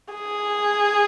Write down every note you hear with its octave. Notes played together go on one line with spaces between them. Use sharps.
G#4